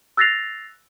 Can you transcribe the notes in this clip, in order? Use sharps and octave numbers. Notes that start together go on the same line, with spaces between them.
E6 F#6 A6 A#6 C7 F7